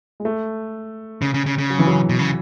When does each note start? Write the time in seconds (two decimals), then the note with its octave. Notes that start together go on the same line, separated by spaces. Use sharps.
0.20 G#3
0.25 A3
1.22 C#3
1.34 C#3
1.46 C#3
1.58 C#3
1.70 F#3
1.79 E3
1.87 F#3
2.09 B2
2.19 C#3